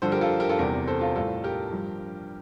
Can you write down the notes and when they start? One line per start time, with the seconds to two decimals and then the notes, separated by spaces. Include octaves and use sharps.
0.02 G2 D3 F3 A4 C5
0.12 G4 A#4
0.21 F4 A4
0.40 G4 A#4
0.49 F4 A4
0.59 E2 C3 G3 G4 A#4
0.88 A4 C5
1.01 F4 A4
1.16 A2 G3 F4 A4
1.44 G4 A#4
1.72 G2 F3